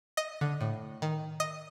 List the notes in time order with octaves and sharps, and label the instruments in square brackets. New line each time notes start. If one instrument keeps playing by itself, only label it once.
[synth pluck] D#5
D3
A2
D#3
D#5